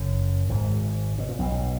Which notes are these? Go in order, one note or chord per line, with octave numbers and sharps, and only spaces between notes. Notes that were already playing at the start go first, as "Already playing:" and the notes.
Already playing: F#1 F#2
G#1 G#2
B2
A#2
B1 B2